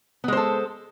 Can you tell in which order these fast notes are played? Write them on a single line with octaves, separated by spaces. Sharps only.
B3 G#3 C5 A4